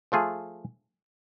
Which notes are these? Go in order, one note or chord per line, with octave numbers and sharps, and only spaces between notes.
F3 A3 F4 G#4